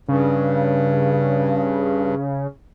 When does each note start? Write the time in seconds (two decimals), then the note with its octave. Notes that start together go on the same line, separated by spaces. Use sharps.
0.08 G2 C#3